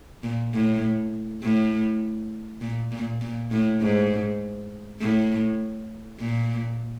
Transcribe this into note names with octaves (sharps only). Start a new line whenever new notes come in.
A#2
A2
A2
A#2
A#2
A#2
A2
G#2
A2
A#2